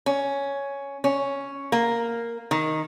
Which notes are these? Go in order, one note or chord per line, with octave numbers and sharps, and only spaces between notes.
C#4
C#4
A#3
D#3